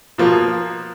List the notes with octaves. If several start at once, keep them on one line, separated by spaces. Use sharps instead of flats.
B2 F3 A#3